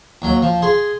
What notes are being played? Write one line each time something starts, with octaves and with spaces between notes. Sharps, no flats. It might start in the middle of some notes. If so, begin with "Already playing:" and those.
D#2 F#3
F3
G#4 C6